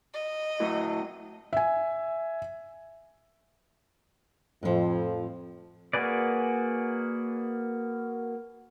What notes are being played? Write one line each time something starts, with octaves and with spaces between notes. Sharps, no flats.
D#5
A3 E4 F#4
E5 G#5
F2 A2 F3
A#3 F#4 G#4 B4 D5